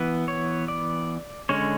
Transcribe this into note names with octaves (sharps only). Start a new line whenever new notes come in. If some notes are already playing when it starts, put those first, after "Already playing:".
Already playing: E3 B3
C#5
D5
D3 G#3 C#4 C#5